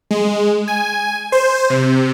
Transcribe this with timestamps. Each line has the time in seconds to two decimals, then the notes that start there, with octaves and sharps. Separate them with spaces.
0.11 G#3
0.68 G#5
1.32 C5
1.70 C3